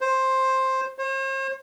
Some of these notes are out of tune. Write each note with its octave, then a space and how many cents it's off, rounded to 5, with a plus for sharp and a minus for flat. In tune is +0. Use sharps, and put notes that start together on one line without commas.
C5 +10
C5 +45